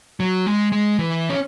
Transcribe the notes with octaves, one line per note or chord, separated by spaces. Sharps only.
F#3
G#3
G#3
E3
C#4